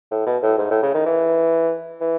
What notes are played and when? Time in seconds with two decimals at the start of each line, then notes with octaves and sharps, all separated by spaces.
0.11 A2
0.27 B2
0.43 A2
0.58 G#2
0.71 A2
0.83 C#3
0.94 D#3
1.06 E3
2.01 E3